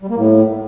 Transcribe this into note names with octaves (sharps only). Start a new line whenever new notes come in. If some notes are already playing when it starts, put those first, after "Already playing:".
G3
A#3
A2